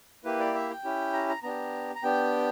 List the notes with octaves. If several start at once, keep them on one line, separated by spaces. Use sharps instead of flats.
A#3 E4 G4 B4
D5
E5
G5
C#4 E4 G4
A#5
A#5
B3 D4 G4 A#5
A#5
B3 D4 G4 G5